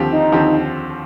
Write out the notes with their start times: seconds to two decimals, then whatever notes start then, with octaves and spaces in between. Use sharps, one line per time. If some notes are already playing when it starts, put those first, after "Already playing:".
Already playing: D#2 D3 F3 C4 G4
0.11 D#4
0.32 D#2 D3 F3 C4 G4